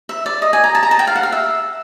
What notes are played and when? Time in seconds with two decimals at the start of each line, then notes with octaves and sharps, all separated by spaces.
0.09 E5
0.26 D5
0.42 D#5
0.53 G#5
0.64 A#5
0.75 A5
0.83 A#5
0.91 A5
0.99 G5
1.07 F5
1.15 F#5
1.23 F5
1.32 E5